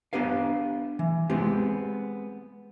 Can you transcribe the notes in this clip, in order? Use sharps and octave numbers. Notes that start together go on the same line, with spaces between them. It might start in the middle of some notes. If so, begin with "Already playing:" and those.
B3 D4 G4 B4 F5
E3
G#3 B3 C4 G4